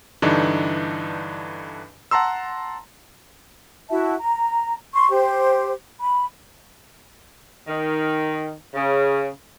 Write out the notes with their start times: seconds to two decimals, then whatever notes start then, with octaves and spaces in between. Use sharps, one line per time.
0.22 G2 D3 E3 D4 D#4
2.11 F#5 A5 A#5 C6 E6
3.90 E4 F#4 E5 A5
4.19 A#5
4.93 C6 C#6
5.09 G4 C5
6.00 B5
7.67 D#3
8.74 C#3